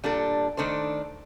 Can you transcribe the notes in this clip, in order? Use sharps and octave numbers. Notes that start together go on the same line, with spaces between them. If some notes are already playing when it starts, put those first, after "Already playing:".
A#2 G3 D4 A4
D#3 A3 D4 A4 C5